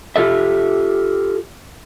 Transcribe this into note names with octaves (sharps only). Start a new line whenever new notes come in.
F4 G4 A4 E5